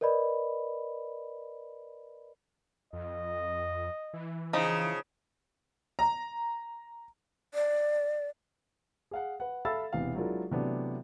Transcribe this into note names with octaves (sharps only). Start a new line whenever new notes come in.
A#4 B4 D5 D#5 B5
F2 D#5
E3
C#3 F3 D#4
A#5
D5
G#4 F5 F#5
B4 F#5
A4 E5 F5 B5 E6 A6
E1 C3 E3 B3 F5
F#3 G#3 D4 E4 F4 A#4
C3 E3 F#3 A3 B3 D4